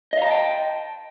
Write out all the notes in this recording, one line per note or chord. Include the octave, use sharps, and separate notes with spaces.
D#5 F5 G5 A5 A#5